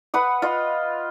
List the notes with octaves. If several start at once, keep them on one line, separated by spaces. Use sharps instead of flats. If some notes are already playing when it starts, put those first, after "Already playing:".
B4 F#5 D#6
F4 D#5